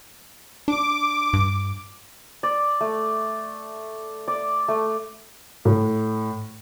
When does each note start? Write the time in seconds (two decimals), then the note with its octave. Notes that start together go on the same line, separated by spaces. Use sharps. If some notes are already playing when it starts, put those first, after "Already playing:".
0.68 D4 D6
1.33 G2
2.43 D5
2.81 A3
4.28 D5
4.68 A3
5.65 A2